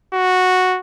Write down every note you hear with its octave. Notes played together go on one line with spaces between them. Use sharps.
F#4